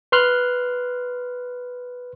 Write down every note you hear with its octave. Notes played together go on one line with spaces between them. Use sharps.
B4 C6 F6 F#6